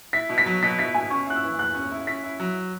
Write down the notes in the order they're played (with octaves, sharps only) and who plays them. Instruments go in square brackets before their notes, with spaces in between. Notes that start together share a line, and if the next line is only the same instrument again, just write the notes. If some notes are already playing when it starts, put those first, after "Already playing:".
[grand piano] E4 [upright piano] B6
[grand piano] B2
[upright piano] B6
[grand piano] F#3
[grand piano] B2 [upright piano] B6
[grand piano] E4 [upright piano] B6
[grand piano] B2 [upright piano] G#5
[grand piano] C#4 [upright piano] C#6
[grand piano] E4 [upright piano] F#6
[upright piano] E6
[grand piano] E3
[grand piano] E2 [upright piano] F#6
[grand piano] C#4
E4
[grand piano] C#4 [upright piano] B6
[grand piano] E4
F#3